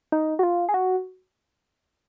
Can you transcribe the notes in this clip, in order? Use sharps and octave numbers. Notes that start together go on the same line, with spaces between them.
D#4
F#4
F4
G#4
F#4